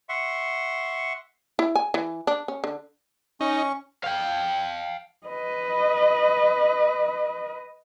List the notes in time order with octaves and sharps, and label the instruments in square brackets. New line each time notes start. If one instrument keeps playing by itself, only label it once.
[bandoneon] E5 F#5 C6 C#6
[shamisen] E4
G#5
E3
D4
C#4
D3
[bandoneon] C#4 C#6 [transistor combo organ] D#4
[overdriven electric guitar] F5 G5
[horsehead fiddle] B4 D#5